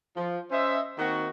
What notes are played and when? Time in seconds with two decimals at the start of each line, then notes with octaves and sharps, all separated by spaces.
0.16 F3
0.51 C#4 C5 D#5 E5
0.98 D#3 A#3 C4 F#4